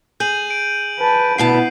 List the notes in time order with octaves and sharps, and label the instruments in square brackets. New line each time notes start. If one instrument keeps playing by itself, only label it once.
[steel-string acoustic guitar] G#4 [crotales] G6 D#7 F#7
[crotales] D7
[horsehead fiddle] B4 A5
[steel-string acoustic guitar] D2 B2 A5 [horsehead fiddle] B3 E4 [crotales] C7